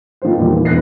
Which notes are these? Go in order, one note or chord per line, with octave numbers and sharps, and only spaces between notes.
D#3 F3 A3 A#3 C5
E2 A#2 G3
E3
E1 B3 F#6 A#6 C7